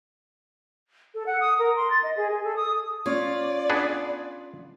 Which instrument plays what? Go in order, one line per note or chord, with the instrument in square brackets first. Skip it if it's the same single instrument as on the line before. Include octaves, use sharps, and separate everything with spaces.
[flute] A4
F#5
D#6
A#4
C6
A6
D#5
G#4
G#4
A4
D#6
[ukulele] C#4 C#5 [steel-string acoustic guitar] F4 [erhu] D5
[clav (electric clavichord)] B3 D4 G#4